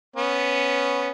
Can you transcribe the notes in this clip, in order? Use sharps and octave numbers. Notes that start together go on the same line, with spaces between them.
B3 C#4